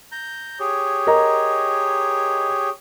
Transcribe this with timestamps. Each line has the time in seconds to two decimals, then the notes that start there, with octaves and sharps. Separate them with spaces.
0.12 A#5 G6
0.60 G4 G#4 C#5
1.07 A#4 D#5 A#5